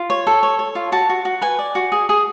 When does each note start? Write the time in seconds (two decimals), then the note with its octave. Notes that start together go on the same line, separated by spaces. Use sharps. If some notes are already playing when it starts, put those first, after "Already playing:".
Already playing: F4
0.10 C#5
0.27 A4
0.43 C#5
0.59 C#5
0.75 F4
0.92 F#4 A5
1.09 F#4
1.25 F#4
1.41 B4 G#5
1.59 D5
1.75 F#4
1.92 G#4
2.09 G#4